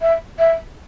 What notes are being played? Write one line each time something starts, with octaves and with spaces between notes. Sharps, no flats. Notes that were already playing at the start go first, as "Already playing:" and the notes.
E5
E5